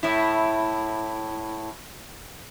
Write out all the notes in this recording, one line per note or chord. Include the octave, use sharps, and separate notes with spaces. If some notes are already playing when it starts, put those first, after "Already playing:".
A2 E4